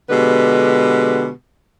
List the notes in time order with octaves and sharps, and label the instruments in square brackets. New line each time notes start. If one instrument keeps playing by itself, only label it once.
[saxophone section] B2 D3 G#3 G4 B4